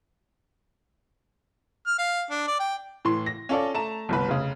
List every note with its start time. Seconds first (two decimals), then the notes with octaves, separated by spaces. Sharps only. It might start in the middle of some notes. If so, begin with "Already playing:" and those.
1.87 F6
1.98 F5
2.30 D4
2.48 D5
2.60 G5
3.05 A2 E3 C6
3.26 A#6
3.49 C#4 F4 A4 C#5 D5
3.74 A3 A5 A#5 E7
4.09 G1 C2 B4
4.28 F1 C#3